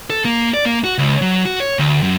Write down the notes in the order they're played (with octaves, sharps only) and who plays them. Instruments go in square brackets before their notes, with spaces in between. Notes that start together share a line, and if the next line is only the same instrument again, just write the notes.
[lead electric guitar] A4
A#3
D5
A#3
F#4
C#2
F#3
F#4
C#5
D2
F#2